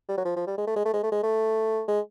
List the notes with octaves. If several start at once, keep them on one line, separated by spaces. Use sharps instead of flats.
G3
F#3
F3
F3
G3
G#3
A3
G#3
A3
G#3
A3
G#3
A3
G#3